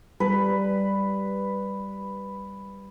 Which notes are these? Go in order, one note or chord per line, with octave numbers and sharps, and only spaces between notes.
G3 B4